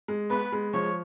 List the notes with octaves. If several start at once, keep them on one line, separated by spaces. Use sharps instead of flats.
G#3
B3 B4
G#3
F3 C#5